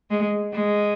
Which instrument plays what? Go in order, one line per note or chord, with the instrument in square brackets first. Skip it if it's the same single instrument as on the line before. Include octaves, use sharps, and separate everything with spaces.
[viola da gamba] G#3
G#3